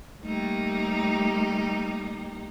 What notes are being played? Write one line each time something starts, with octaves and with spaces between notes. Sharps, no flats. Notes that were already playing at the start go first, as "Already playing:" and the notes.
G3 A3 A#3 D#4 G4